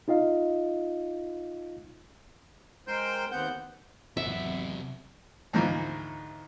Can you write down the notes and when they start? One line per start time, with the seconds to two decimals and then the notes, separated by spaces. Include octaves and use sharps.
0.08 D#4 F4 D#5 F5
2.87 G#3 A#4 C5 G5 C6 G6
3.32 D#2 B3 C4 F#5 G6
4.17 G#1 E2 C3 F#3 E5 F#5
5.53 D2 G#2 E3 F3 A#3